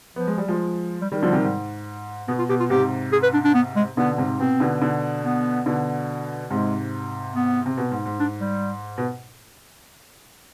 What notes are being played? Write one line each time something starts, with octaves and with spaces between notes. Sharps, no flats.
F3 B3
G#3
G3
F3 G#3
G3
D#3 G3
D3 F3 G3
C3 D#3
G#2
B2 B3
F4
B2 G4
F4
G#2 C3 G4
G#4
B4
D4
D4
B3
G#3
B2 D3 B3
G#2 C3
B2 C4
B2 D3
B2 D3
B3
B2 D3
G#2 C3 G#3
B3
C3
B2
G#2
G#2
D4
G3
B2